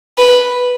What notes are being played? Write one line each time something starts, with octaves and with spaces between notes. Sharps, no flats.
B4